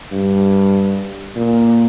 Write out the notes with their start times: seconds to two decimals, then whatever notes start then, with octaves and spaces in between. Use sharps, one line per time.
0.12 G2
1.36 A#2